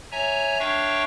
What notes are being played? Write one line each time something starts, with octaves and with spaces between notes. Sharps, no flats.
C#5 E5 G#5 A#5
D4 C#5 E5 F5 G5 C#6